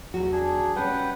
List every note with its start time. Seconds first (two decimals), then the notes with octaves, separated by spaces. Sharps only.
0.14 E2 F#3 F#4
0.32 D4 G#4
0.76 G3 C#4 B4 F#5 G5